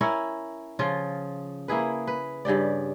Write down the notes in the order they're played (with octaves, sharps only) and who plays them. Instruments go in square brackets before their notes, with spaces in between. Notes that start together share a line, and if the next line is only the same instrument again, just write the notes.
[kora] C#4 E4 A#4 C#5
C#3 F3 F4
A#3 E4 G#4 B4
B4
G2 C#3 G4 D5